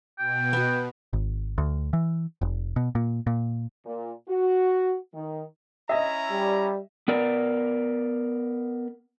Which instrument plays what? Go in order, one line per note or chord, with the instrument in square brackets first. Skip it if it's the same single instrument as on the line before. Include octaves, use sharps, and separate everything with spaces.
[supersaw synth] B2 [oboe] G5
[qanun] B3 F#4
[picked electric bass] G#1
D2
E3
F1
B2
A#2
A#2
[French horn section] A#2
F#4
D#3
[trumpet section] C#4 E4 A#5 [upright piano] D#5 E5
[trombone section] G3
[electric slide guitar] B3 A#4 D5